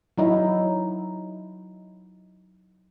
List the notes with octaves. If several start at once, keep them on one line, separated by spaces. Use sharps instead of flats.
F#3 D#4 E4